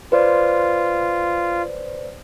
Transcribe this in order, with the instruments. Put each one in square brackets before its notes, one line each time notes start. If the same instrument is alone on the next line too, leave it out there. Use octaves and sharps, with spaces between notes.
[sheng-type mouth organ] F4 [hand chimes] B4 C5 D5